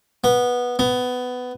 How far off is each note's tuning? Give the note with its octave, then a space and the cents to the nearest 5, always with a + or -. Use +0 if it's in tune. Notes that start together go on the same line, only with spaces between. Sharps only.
B3 -10
B3 +15